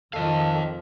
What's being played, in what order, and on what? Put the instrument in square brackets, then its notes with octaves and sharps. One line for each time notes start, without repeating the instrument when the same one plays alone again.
[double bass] F2 F3 [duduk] D#3 [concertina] A4 [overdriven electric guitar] D#5 F5